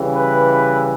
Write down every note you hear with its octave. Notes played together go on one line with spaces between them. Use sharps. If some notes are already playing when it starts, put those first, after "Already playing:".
Already playing: C#3 E3 G3
B4